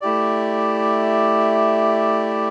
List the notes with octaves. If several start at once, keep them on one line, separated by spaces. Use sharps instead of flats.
A3 E4 G4 D5